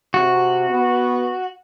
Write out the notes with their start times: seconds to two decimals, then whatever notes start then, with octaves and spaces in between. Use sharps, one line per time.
0.14 C3 F#4
0.71 B3